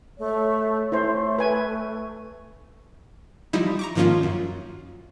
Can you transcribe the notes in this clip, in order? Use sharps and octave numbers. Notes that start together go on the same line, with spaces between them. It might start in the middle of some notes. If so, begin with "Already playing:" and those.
A3 C#5
A3 E4 C5
B4 G#5
F3 G3 D#4 E4
A#5 C#6 D6
G#2 D#3 F3 A#3 C#4 F4
F#2